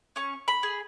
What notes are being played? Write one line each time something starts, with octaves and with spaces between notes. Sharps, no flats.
C#4 C#6
B5
G#4